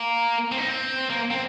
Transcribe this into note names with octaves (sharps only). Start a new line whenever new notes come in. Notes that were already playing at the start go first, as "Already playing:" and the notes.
Already playing: A#3
C4
D#4
C4
A#3
C4